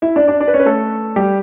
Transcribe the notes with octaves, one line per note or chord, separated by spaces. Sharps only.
E4 E5
D4 D5
D4 D5
D4 D5
B4
C#4 C#5
B4
A3 A4
G3 G4